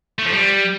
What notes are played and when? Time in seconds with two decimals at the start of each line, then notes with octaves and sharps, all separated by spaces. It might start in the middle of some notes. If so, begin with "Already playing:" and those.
0.19 A3
0.25 F3
0.32 G3